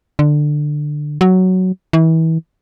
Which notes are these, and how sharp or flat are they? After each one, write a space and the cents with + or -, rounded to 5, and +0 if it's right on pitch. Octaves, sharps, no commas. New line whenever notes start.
D3 +15
F#3 +5
E3 -30